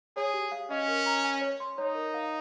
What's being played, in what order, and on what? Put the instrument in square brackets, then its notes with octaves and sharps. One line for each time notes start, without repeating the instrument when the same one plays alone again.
[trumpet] G#4 [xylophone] C#5
[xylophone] G4
F5
[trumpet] C#4 [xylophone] D#5
[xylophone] A#4
A#5
G#5
C#5
C6
[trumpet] D#4 [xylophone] C#5
[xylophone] A#4
F5